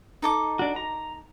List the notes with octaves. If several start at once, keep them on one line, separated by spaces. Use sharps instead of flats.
D#4 A4 D6
D4 F#4
A#5